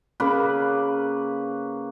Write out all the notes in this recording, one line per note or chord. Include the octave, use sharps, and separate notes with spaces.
C#3 A#3 B4